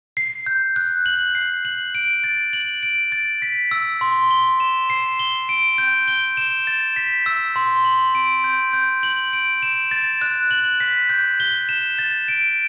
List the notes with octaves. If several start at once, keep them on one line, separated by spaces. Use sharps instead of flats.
C7
G6
F#6
F#7
C7
F#7
D7
A6
F#7
D7
A6
B6
E6
C6
G7
E7
C7
G7
D7
G6
G7
E7
A6
B6
E6
C6
F#7
D7
G6
G6
F#7
D7
E7
A6
F#6
F#7
B6
G6
G7
E7
A6
D7